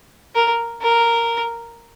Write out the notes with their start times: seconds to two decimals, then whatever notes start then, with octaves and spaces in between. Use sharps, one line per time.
0.35 A#4
0.82 A#4